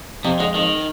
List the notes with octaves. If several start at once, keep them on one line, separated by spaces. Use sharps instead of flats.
F2 C3
D3 G#3
F2 D#3